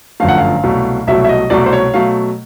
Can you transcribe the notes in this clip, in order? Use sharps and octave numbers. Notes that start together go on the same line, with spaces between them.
G1 F#2 D3 F3 A3 F5
F#5
F5
C2 B2 F#3 A3
C2 B2 F#3 A3 E5
E5
D#5
C2 B2 F#3 A3 D5
C5
C#5
B2 F#3 A3 F5